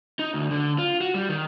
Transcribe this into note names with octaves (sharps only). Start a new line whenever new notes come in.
D#4
D2
D3
F4
F#4
G3
D#3